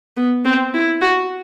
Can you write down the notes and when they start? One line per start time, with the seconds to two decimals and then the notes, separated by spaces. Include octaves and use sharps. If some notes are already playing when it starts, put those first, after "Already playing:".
0.17 B3
0.45 C4
0.74 E4
1.01 F#4